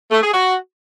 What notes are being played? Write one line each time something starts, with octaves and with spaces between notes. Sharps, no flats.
A3
G#4
F#4